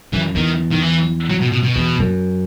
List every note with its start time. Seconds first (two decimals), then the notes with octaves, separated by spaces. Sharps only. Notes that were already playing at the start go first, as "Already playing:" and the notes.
0.13 F#2 E3
0.35 E2 D#3
0.71 D#3
0.82 E3
1.30 F#3
1.41 B2
1.52 B2
1.64 B2
1.76 E2
2.00 F#2